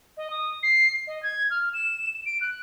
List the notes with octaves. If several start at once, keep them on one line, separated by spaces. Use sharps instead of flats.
D#5
D#6
C7
D#5
G#6
F6
E7
D7
F#6